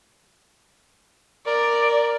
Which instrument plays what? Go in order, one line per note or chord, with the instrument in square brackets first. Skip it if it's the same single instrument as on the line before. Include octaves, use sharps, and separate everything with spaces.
[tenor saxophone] A#4 [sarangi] D5